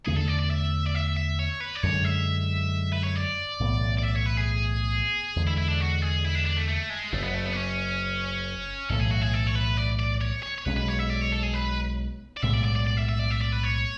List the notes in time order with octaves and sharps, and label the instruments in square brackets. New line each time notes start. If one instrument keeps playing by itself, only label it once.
[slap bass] E2 D3 A3 D4 [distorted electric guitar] G#4
[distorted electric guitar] A4
D5
D5
E5
D5
E5
E5
C#5
B4
D5
[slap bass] F#2 D3 G#3 [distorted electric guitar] C#5
[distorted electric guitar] E5
B4
C#5
D5
[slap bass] B1 A2 E3 B3
[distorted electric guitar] D5
E5
C#5
B4
G#4
[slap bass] E2 D3 G#3
[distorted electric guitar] E4
E4
D4
F#4
G#4
E4
D4
D4
A3
A3
G#3
[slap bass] F#1 F#2 C#3 [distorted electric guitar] A3
[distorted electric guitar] B3
A3
B3
D4
C#4
[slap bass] B1 A2 E3 A3 [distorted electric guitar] A4
[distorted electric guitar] G#4
F#4
G#4
A4
C#5
B4
D5
D5
C#5
C#5
C#5
[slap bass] B1 B2 G#3 C#4 [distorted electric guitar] B4
[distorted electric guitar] B4
C#5
E5
D5
C#5
A4
G#4
B4
D5
[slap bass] B1 A2 G#3 B3 [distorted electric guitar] E5
[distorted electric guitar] D5
D5
D5
D5
E5
E5
D5
E5
D5
B4
C#5